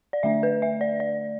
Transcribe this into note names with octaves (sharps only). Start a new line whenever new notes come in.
D5
D3 A3 D4 E5
B4
E5
D5
D5